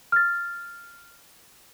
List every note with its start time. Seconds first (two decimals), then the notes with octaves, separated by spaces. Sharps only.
0.12 F6 A6